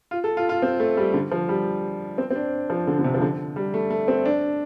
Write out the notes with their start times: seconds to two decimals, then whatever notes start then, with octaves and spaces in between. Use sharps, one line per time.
0.11 F4
0.24 A4
0.37 F4
0.49 F4
0.62 C4
0.80 A3
0.97 G3
1.14 D3
1.32 F3
1.49 G3
2.18 C4
2.31 C4
2.36 D4
2.70 F3
2.87 D3
2.99 D3
3.04 C3
3.14 F3
3.22 D3
3.56 G3
3.74 A3
3.90 A3
4.08 C4
4.25 D4